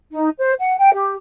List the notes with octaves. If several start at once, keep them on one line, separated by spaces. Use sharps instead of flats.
D#4
C5
F#5
G5
G4